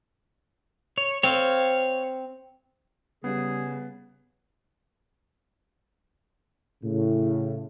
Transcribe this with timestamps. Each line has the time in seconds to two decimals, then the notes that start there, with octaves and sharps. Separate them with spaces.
0.98 C#5
1.23 C4 C#5 F5
3.24 C#3 G3 B3 G#4
6.84 A2 C#3